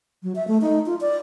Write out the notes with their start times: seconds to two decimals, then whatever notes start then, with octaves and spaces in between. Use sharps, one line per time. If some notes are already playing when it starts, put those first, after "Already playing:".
0.23 F#3
0.35 E5
0.48 A3
0.61 D#4
0.86 F4
1.01 D5